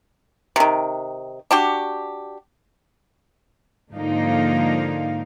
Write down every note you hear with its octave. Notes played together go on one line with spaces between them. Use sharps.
C3 D#3
D4 F#4 G4
G#2 D3 F3 A#3 D#4 F5